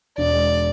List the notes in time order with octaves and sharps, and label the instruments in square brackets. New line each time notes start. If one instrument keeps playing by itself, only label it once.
[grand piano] E1 [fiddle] D5
[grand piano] G#3